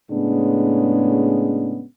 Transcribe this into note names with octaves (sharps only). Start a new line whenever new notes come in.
A2 C#3 G#3 B3 C#4 D4